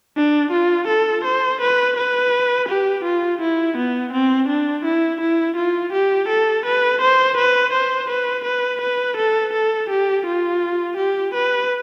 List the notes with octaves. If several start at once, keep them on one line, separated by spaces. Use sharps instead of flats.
D4
F4
A4
C5
B4
B4
G4
F4
E4
B3
C4
D4
E4
E4
F4
G4
A4
B4
C5
B4
C5
B4
B4
B4
A4
A4
G4
F4
G4
B4